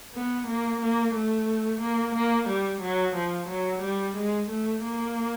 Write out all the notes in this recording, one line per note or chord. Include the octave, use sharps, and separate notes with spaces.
B3
A#3
A#3
A3
A#3
A#3
G3
F#3
F3
F#3
G3
G#3
A3
A#3